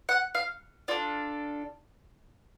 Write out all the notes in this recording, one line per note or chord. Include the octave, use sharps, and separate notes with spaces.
F#5
F5
D4 F4 A4